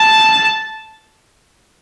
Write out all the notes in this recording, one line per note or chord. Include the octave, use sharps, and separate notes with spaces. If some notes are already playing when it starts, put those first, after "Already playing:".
Already playing: A5